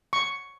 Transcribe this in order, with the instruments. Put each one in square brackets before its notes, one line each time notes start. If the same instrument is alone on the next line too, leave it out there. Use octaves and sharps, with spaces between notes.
[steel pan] C#6